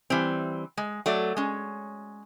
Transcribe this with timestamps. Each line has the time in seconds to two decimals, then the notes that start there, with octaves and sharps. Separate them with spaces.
0.10 E3 G3 C4
0.77 G#3
1.06 F#3 A3 D5
1.37 G#3 C#4